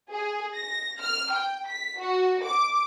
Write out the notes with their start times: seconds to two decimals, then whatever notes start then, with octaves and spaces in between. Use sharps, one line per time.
0.11 G#4
0.55 A#6
1.00 F6
1.32 G5
1.67 B6
1.99 F#4
2.44 D6